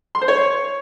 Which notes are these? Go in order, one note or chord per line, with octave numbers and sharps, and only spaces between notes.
C6
C5
C#5